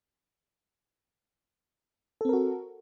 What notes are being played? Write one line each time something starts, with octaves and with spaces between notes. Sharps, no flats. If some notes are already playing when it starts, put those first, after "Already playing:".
C4 F#4 A4 A#4